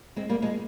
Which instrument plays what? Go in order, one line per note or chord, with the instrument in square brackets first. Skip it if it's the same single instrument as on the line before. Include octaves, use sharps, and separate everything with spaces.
[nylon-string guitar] G#3 C4
G3 A#3
F3 G#3